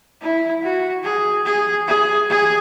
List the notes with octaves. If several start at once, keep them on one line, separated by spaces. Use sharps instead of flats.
E4
F#4
G#4
G#4
G#4
G#4